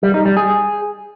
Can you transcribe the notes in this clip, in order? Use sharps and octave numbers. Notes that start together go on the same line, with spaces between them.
G3
D#4
G3
G#4